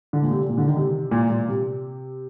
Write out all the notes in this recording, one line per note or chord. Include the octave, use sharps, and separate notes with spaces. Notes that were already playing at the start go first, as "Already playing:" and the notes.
D3
A#2
C3
A#2
D3
D#3
C3
A#2
A#2
C3